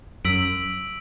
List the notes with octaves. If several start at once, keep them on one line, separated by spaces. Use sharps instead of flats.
F#2 E6 B6 D7 F#7